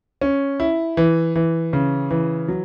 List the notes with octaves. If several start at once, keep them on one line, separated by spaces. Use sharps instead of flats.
C#4
E4
E3
E3
C#3
E3
F#3